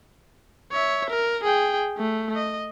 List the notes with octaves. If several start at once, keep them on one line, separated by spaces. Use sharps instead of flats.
C#5 E5
A#4
G#4 G5
A3
D#5